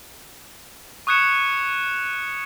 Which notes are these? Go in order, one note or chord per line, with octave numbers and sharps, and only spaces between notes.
C#6 D#6 F#6 G#6 C#7 E7